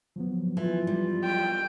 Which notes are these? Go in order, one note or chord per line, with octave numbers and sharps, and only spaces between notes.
F3 F#3 B3
E3 F4
G3
G5